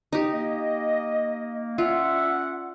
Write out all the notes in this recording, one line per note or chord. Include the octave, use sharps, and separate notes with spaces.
D#4 G4
A#3 D#5
C#4 F4 D5 E5 F#5